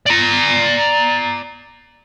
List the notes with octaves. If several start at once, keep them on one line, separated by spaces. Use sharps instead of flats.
D5 A#5